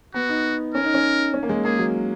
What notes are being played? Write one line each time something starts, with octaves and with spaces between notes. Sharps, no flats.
B3 F#4
D#4
C#4 A#4
D#4
C#4
C#4
A#3
G#3
A#3 G#4
F#3